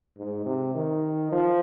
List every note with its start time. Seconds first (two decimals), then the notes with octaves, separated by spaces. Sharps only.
0.18 G#2
0.45 C3
0.75 D#3
1.32 F3